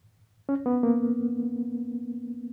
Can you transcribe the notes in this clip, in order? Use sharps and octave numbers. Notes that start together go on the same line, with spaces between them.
C#4
B3
A#3